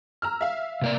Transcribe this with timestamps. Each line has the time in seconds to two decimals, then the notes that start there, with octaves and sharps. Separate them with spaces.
0.22 A#5 E6 F6
0.41 E5 F5
0.82 C3 A#3 D5